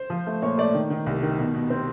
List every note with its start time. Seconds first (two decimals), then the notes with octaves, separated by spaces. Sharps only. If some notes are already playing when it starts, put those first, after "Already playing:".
Already playing: C5
0.10 F3
0.27 A3
0.42 A#2 C#5
0.58 A3 D5
0.75 D#3
0.90 D#3
1.06 C2
1.22 D#3
1.39 B2
1.54 B2
1.70 C4